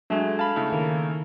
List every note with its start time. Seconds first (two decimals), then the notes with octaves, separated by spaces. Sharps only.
0.10 F#3 G#3 A3 D4 A4 G#5
0.39 F5 A5 B5
0.56 C#3 A3 E4
0.72 D#3 A#3